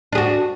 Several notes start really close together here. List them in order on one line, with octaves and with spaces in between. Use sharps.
D4 G#4 F#4